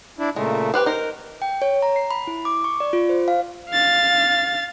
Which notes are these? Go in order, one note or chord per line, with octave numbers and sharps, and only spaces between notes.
D4 E4
A#2 C#3 G#3 A3
G4 B4 C5
D#4 A#4 C5
G5
C#5
A#5
C7
B5
E4
D6
C#6
D5
F4
C5
F5
F5 A6